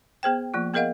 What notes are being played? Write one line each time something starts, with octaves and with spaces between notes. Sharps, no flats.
B3 G#4 C5 G5
F3 A#3 F4
B3 G#4 A#4 D#5 F5 F#5